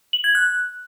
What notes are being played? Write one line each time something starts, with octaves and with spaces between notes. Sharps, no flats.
F#7
G#6
F#6